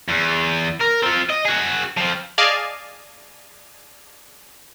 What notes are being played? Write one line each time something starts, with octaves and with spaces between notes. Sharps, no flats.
E2
A#4
C4 F4
D#5
F#4 G#4
F3 C4
G#4 D5 D#5 F5 G#5 A5